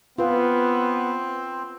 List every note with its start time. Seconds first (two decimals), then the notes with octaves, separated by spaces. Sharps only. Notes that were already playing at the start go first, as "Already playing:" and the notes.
0.18 B3 C4 F4 B4